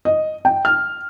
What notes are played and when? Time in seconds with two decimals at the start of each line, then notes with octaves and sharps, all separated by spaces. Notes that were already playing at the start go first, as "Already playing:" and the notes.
0.05 D#5
0.45 G5
0.65 F6